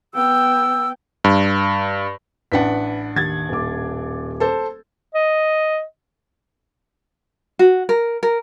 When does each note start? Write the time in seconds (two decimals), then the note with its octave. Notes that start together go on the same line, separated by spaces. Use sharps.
0.14 B3 G5 E6
1.24 G2
2.52 A1 D4 B4 F#5 B6
3.16 D#2 G#6 A6
3.49 D#1 D6
4.40 A4 C5
5.15 D#5
7.59 F#4
7.89 A#4
8.23 A#4